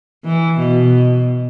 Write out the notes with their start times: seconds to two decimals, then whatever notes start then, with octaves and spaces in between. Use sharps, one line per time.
0.25 E3
0.59 B2